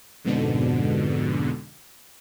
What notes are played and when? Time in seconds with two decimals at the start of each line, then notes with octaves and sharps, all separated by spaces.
0.24 F2 G#2 B2 D3